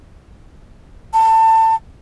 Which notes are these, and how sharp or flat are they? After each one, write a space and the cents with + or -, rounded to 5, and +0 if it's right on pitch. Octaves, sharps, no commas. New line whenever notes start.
A5 +25